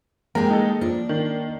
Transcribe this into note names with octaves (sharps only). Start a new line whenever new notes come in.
G#3 A#3 G4 A#4
D#4 A4
F3 D4
D#3